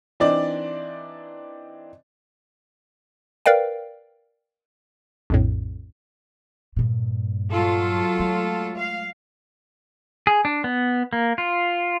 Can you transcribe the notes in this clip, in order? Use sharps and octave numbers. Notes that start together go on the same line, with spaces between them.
E3 C4 D4 D#4 D5
A#4 B4 D5 F5 G5
A#1 F2 A2
G2 A#2
F#3 F4 A4
G#3 A3
F5
G#4
D4
B3
A#3
F4